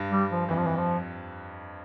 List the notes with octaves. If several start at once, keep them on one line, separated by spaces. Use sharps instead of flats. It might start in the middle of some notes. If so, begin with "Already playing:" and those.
Already playing: G2
G3
F3
F2 E3
F3
E3
F3